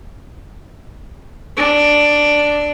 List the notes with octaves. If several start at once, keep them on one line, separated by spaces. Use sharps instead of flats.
D4